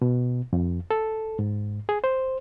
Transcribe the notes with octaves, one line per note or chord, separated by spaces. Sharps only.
B2
F2
A4
G#2
G#4
C5